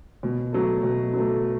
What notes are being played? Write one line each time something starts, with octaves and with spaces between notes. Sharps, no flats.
B2
F#3 A3
B2
F#3
A3